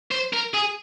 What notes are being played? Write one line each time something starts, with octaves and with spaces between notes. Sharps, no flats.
C5
A#4
G#4